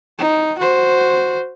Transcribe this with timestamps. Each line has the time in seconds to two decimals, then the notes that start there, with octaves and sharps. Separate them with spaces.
0.19 D#4
0.59 F#4 C5